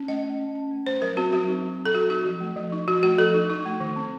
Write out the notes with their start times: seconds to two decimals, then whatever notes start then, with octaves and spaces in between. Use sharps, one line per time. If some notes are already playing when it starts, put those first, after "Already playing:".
Already playing: C#4
0.08 A3 D#5
0.24 A3
0.40 C#4
0.55 C#4
0.71 A3
0.86 A3 C5
1.02 F#3 A#4
1.17 C4 F#4
1.33 F#3 F#4
1.48 D#4
1.64 F#3
1.79 C4
1.86 A4
1.95 F#3 F#4
2.10 D#4 F#4
2.25 F3
2.41 A3
2.57 F3
2.72 D#4
2.88 F3 F#4
3.03 A3 F#4
3.18 F3 A4
3.34 D#4
3.50 D#4
3.65 A3
3.80 D#3
3.96 C4